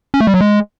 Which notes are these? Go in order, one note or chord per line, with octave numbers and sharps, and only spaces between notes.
C#4
A3
G3
F#3
G#3